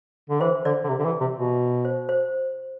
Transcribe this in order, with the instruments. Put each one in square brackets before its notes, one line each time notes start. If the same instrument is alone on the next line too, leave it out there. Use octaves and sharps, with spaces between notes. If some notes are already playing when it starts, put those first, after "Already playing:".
[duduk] D3
[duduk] E3 [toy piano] C5
[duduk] D3 [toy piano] D5
[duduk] D3
C3
D3
E3
C3
B2
[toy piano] C5
C5